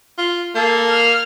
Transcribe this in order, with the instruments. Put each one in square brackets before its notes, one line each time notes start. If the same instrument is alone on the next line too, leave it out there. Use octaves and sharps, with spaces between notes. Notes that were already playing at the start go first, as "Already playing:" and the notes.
[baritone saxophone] F4
[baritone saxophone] A#3 [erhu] A4
[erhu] F6